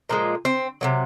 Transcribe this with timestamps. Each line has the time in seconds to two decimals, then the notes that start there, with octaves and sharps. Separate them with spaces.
0.09 A#2 F3 G#3
0.45 C4
0.81 C3 D#3 F#3